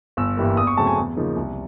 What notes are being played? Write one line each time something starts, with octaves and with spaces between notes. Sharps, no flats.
G1 E6
G2 E3 G3 A#3
E2 D#6
C#6
C#3 F#3 A3 C4 A5
G#5
E2
C#3 F3 A#3 D#4
C2